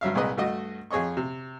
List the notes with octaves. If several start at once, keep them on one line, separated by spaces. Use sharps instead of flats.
G2 F#3 E5 F5
C2 A#2 G#3 B4 D#5
G2 A3 F#4 D#5
F2 G#4 C#5 D#5 C#6
C3